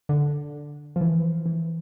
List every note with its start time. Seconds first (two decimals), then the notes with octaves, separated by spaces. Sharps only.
0.09 D3
0.96 F3
1.01 E3
1.46 E3